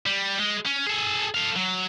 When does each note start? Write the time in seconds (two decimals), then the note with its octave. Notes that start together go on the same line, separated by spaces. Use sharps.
0.06 G3
0.39 G#3
0.66 C#4
0.86 G#4 A4
1.34 A4 F5
1.56 F#3